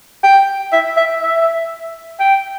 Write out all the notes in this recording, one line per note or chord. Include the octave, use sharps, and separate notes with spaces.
G5
E5
E5
E5
G5